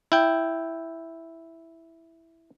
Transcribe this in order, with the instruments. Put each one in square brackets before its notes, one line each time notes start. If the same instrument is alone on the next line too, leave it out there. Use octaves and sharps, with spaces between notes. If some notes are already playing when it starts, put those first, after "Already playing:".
[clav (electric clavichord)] E4 G5